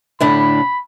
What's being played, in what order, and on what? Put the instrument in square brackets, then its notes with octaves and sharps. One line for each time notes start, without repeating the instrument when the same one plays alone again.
[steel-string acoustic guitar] A2 D3 D4 [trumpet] B5